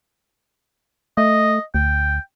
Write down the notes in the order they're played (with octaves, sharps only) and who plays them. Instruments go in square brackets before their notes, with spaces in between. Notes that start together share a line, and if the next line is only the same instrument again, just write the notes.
[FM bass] A3 [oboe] D#5
[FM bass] D2 [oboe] G5